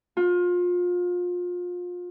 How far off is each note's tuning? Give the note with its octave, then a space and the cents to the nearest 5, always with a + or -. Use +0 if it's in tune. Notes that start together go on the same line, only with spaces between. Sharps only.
F4 +30